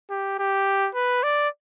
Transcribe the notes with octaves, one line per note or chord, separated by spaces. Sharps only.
G4
G4
B4
D5